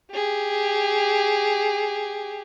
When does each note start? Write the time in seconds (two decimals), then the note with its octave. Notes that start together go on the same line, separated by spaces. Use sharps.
0.13 G4 G#4